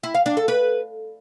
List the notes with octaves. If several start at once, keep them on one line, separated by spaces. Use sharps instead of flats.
E4
F5
D4
A4
B4